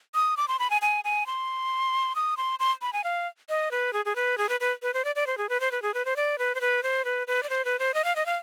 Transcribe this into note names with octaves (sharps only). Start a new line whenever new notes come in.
D#6
D6
C6
B5
G#5
G#5
G#5
C6
D#6
C6
C6
B5
G#5
F5
D#5
B4
G#4
G#4
B4
G#4
B4
B4
B4
C5
D5
D5
C5
G#4
B4
C5
B4
G#4
B4
C5
D5
B4
C5
B4
C5
B4
B4
D5
C5
B4
C5
D#5
F5
D#5
F5